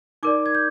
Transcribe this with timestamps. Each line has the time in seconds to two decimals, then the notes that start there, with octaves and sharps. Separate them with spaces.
0.23 D#4 A#4 D5 D6
0.46 G#6
0.55 G6